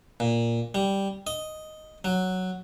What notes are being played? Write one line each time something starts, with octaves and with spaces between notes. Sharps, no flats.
A#2
G3
D#5
F#3